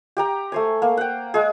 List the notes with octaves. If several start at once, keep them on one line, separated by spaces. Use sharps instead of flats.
G4 G5 A#5
A3 C5 G#5
A#3
F#5 G5
G#3 G#4